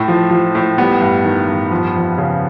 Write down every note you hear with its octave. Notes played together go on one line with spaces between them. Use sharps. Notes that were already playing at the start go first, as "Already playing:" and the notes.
Already playing: A2
F3
F3
A2
G3 B3
G2
D#3
G2
F3
F2
C#3